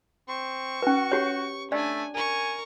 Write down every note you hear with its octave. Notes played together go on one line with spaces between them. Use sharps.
C4 C#6
C#4 F#4 B4
G4 C#5
A3 D4 D5 G#5
A#4 G#5 C#6